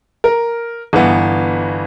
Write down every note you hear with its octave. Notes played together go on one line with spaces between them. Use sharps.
A#4
G1 E3 B3